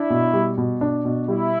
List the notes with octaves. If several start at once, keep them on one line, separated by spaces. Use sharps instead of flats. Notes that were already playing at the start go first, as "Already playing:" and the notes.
Already playing: D4 E4
B2
G3
B2
D4
B2
G3 E4